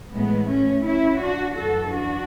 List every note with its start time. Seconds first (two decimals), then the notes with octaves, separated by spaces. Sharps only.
0.12 A2 E3 G#3 B3
0.49 A3 C#4
0.84 C#4 E4
1.20 D4 F#4
1.56 F#2 E3 F#4 A4
1.92 D4 F#4